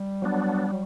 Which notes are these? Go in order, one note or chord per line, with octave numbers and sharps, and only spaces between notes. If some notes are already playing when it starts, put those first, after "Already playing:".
Already playing: G3
F#3 B3 D4
F#3